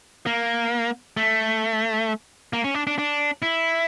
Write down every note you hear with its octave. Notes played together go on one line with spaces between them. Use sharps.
A#3
A3
A#3
C#4
D4
D4
D4
E4